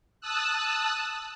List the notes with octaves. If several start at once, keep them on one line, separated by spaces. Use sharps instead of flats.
A5 D#6 E6 F#6